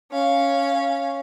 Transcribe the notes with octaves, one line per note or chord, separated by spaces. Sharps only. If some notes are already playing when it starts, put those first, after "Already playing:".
C#4 F5